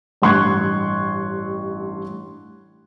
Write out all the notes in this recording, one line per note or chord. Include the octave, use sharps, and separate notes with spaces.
A1 G2 C6 C#6 F#6 G#6